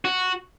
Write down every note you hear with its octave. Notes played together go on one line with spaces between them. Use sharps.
F#4